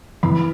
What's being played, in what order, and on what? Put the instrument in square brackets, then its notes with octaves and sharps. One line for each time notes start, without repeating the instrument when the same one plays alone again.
[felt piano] E3 B5